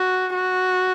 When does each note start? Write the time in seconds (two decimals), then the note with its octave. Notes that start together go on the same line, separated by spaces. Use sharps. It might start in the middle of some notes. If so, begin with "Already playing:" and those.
Already playing: F#4
0.34 F#4